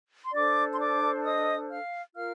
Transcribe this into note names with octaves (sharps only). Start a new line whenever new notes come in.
C6
D4 A4 C5 D5 D6
C6
D5 D6
D#5 D#6
F5 F6
F4 A#4 F5 F6